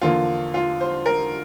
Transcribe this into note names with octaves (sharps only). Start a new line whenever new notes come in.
E2 D3 F3 A#3 F4
F4
C5
A#4